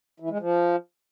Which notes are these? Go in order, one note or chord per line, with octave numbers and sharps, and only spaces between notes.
E3
G#3
F3